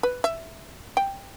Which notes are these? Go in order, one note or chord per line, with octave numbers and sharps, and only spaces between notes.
B4
E5
G5